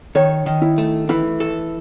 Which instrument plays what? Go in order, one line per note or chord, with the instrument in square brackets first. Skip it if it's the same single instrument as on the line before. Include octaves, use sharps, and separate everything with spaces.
[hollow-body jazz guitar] D#3 [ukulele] C#5
[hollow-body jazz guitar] D#3
[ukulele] E4
[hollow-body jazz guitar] A3
[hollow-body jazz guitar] E3 [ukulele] E4
[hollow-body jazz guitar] A4